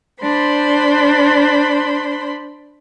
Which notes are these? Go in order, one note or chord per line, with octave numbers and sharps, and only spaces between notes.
D4 C5 B5 C6